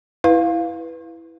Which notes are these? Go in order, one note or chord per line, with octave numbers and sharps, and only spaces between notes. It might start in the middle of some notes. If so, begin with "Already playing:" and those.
E4 B4 F5